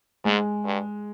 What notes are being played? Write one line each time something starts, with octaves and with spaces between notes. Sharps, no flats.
G#2 G#3
G2